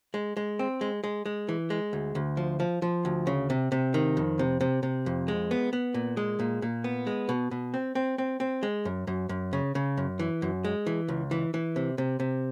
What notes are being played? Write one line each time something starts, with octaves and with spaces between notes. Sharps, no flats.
G#3
G#3
C4
G#3
G#3
G#3
E3
G#3
D2
D2
F3
F3
F3
D2
C#3
C3
C3
D#3
F2
C3
C3
C3
F2
G#3
B3
B3
A#2
G#3
A#2
A#2
B3
G#3
B2
B2
C4
C4
C4
C4
G#3
F#2
F#2
F#2
C#3
C#3
F#2
E3
F#2
G#3
E3
C#2
E3
E3
C3
C3
C3